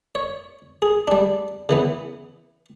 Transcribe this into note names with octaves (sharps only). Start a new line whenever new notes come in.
C#5
G#4
G3 D4
C#3 E3 B3